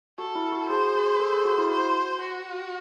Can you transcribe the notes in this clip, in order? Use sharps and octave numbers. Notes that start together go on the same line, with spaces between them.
F#4 A4
E4
F#4
G#4 C5
G#4
A4
G#4
F#4
E4
F#4 C5
F#4